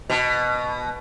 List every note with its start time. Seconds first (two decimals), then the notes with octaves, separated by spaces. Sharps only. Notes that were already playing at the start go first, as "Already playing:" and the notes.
0.10 B2